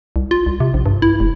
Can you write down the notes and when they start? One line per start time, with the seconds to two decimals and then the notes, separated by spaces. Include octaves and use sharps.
0.16 C2
0.31 F4
0.46 C2
0.60 C3
0.74 A#1
0.86 G2
1.02 E4
1.20 F1